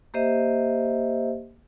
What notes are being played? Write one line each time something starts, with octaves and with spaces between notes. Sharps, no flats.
A#3 G4 C5 D#5 E5